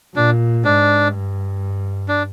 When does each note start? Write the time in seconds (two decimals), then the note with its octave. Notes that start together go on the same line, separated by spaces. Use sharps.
0.16 A#2 D4
0.64 G#2 D4
1.13 G2
2.08 D4